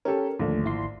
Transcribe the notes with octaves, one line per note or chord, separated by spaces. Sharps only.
C#4 G4 A4 A#4
A#1 D#2 D3 A3
G#1 E4 C6